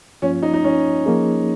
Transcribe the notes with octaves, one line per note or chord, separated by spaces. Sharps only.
G2 F3 A#3 C#4 F4
D#4
D#4
C#4
F3 A#3 D#4 G#4 C#5